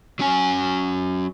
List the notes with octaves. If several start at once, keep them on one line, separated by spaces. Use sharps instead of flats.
F#3 C#4 G#5